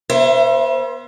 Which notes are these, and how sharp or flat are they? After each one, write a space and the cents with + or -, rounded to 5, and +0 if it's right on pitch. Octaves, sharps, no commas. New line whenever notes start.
B3 -35 C5 +10 E5 +35